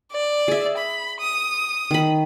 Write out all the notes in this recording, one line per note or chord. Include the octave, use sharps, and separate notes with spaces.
D5
G#4 E5
B5
D#6
D#3 B5